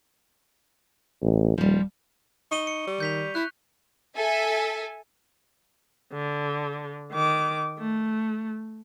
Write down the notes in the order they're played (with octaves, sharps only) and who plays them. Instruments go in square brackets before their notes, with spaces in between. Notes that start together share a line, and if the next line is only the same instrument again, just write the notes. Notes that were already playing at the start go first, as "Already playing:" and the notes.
[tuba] A1
[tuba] D#1 [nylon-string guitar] F3 G3
[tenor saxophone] D#4 [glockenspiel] C#6 D#7 G7
[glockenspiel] C#7
[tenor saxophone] G3
[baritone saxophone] D#3 [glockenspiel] G6 B6 F7
[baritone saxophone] E4 [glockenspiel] F#6
[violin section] A4 E5 G#5
[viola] D3
D#3 D6
A3